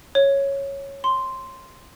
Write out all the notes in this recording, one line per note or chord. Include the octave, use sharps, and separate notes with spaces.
C#5
C6